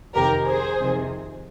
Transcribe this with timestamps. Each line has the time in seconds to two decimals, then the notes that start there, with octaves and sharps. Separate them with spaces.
0.14 F2 C3 D#3 G4 A#4
0.47 G#4 C5
0.79 F2 C3 D#3